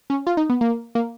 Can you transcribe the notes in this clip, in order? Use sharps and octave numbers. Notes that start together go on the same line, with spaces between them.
C#4
F4
D#4
B3
A#3
A#3